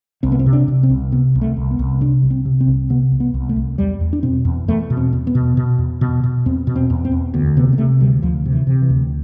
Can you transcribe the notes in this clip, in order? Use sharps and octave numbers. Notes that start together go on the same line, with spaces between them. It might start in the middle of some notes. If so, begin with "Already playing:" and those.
C2 C4
B3
C4
C3
D4
C3
C4
C2
C3 B3
C2
A3
C2
B3
C2
C3 D4
C2
C4
C3
C4
C2
C3 B3
C2
B3
C2
A3
C2
E2 G3
E2
D4
B2 C4
E2
E2 A3
B2
C4
E2
B3
B2
B2
E2
B2
B2
E2 C4
B2
C4
E2
C4
E2
D2 B3
C3 B3
B3
C3 A3
D2 G3
D2 F3
C3
E3
C3
E3
D2